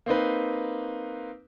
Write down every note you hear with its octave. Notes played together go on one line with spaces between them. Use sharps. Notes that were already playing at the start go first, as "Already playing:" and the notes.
A#3 C4 D#4 B4